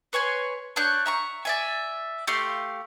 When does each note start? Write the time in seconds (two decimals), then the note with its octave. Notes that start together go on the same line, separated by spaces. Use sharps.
0.13 B4 C#5 G#5 C6
0.76 D4 C#5 F#6 G6
1.06 E5 A#5 C#6
1.45 D5 E5 G#5
2.27 A3 G4 F5 C6